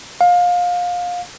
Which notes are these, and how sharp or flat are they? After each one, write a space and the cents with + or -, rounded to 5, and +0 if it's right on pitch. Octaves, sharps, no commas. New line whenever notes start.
F5 +25